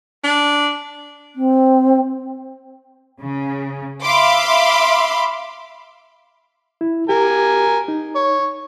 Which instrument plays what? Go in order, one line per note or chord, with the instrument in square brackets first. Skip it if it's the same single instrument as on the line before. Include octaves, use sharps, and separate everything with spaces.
[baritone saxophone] D4
[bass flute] C4
[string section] C#3
E5 F5 B5 C6 D6
[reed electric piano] E4
[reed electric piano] G4 [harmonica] A#4 G#5
[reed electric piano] D#4
[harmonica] C#5